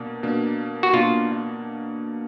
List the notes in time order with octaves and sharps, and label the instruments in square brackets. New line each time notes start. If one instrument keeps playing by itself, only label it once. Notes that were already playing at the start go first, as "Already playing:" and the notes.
Already playing: [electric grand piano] B2 A#3 D4
B2 A#3 D4
[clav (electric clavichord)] F#4
[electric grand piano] B2 A#3 D4 [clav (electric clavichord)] F4